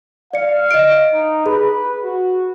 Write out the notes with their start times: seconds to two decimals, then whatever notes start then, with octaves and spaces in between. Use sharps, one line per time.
0.33 D5 F5 C#7
0.71 D#5 D7
1.13 D#4
1.46 G#4 B4
2.03 F#4